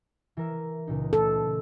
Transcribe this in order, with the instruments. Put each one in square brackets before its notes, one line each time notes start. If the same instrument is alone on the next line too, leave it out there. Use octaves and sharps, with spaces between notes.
[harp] E3 A#4 E5
C#2 A#2 D#4
[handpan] A4
[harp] C6